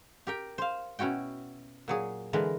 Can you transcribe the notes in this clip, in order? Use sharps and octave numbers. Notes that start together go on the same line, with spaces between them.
G4 A#4 G5
C5 F5
B2 C#4 E4 F#4 G5
A#2 F#3 G#4
D3 E3 G#3 A#4 B4